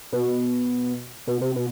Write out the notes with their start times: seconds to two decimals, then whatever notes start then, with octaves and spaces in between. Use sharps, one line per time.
0.12 B2
1.27 B2
1.41 C3
1.56 B2